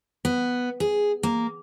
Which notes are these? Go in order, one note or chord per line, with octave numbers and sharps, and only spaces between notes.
B3
G#4
A#3